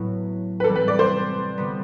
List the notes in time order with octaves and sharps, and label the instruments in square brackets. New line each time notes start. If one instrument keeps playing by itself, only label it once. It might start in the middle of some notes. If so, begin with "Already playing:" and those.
Already playing: [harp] A2 F#3 B3 E4
[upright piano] B4
[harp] E3 G3 C4 [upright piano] A4
[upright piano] B4
D5
C5
[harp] D3 G3 B3